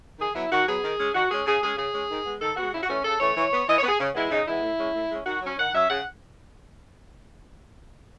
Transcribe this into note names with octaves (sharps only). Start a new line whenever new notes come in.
D#3 G#4
F#3 B3 E4
D#3 F#4
F#3 B3 G#4
D#3
G#3 C#4
D#3 F#4
G#3 C#4 G#4
C#3 G#4
G#3 C#4 G#4
C#3 G#4
G#3 C#4
D#3
G#3 B3
D#3 A4
G#3 B3 F#4
C#3 E4
F#4
E3 A3 C#4
C#3 A4
E3 A3 C#4 C#5
E3
B3
E3 D#5
C#5
B3
G#4
C#3
E3 G#3 B3 E4
C#3 D#4
E3 G#3 B3 E4
A2
G#3 C#4
A2
G#3 C#4
D#3 F#4
F#3 C#4
D#3 F#5
F#3 C#4 E5
C#3 F#5